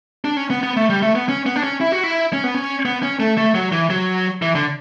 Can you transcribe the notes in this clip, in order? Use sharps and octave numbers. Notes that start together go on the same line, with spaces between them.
D4
C#4
B3
B3
A3
G3
A3
B3
C#4
B3
D4
C#4
E4
F#4
E4
C#4
B3
C#4
B3
C#4
A3
A3
F#3
E3
F#3
E3
D3